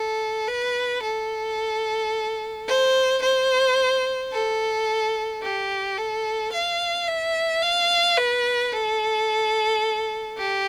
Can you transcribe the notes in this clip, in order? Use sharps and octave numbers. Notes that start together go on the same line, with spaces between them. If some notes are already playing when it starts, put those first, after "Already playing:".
Already playing: A4
B4
A4
C5
C5
A4
G4
A4
F5
E5
F5
B4
A4
G4